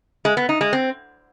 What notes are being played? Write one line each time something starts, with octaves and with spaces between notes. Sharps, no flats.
G#3
B3
D#4
G#3
C4